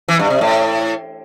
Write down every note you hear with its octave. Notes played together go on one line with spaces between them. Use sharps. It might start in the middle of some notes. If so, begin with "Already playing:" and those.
E3
G2
C3
A2